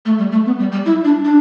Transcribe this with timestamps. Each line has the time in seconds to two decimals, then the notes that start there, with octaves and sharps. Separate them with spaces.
0.06 A3
0.19 G3
0.32 A3
0.46 B3
0.59 G3
0.72 G3
0.86 E4
1.05 D4
1.25 D4